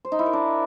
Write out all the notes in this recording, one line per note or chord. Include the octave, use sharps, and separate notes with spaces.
C5
D#4
E4
A#4
D4